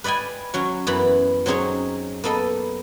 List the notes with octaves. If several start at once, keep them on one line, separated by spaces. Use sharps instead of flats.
B4 D5 D#5 G5 G#5
F#3 C#4 F#4
F#2 E3 B3 B5
F#3 C4 C#4 D#4 G#4 C#5
A#3 B3 A4 D#5